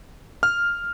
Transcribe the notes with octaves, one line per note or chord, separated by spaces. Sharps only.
F6